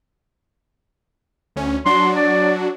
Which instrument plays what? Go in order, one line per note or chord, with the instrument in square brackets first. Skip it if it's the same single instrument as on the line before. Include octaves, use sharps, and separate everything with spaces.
[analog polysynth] D2 C#4
[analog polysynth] F#3 D4 F#4 [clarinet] C6
[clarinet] D5